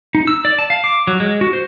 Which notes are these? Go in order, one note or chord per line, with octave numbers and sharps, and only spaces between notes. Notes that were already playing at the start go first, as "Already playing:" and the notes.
D#4
E6
D5
A5
F5
D6
F#3
G#3
F#4
C5